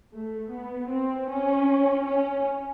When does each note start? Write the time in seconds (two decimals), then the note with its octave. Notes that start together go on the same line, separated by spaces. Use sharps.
0.14 A3
0.51 B3
0.89 C4
1.28 C#4
2.05 C#4